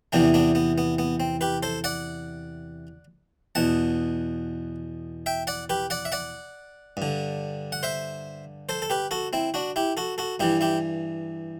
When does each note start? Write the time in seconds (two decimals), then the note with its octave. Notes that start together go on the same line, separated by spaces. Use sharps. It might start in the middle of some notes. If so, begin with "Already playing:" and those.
0.12 E2 C3 E3 B3 D4
0.34 B3 D4
0.55 B3
0.78 B3
0.99 B3
1.20 C4
1.41 G4 B4
1.63 A4 C5
1.84 D5 F#5
3.55 E2 B2 F#5 A5
5.26 E5 G5
5.47 D5 F#5
5.70 G4 B4
5.90 D5 F#5
6.05 E5
6.12 D5 F#5
6.97 G2 D3
7.72 F#5
7.83 C5 E5
8.69 A4 C5
8.82 A4
8.90 G4 B4
9.11 F#4 A4
9.33 C4 E4
9.54 D4 F#4
9.76 E4 G4
9.97 F#4 A4
10.18 F#4 A4
10.40 G2 E3 E4 G4
10.61 E4 G4